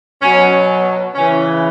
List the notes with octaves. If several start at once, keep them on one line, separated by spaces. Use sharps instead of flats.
B2 F#3 C#4
C#3 E3 C#4